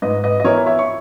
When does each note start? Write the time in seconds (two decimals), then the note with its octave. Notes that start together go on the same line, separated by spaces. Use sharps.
0.02 G#2 B4 D#5
0.24 B4 D#5
0.40 D#5
0.44 E3 B3 E4 A#4 C#5
0.66 C#5 E5
0.79 C#6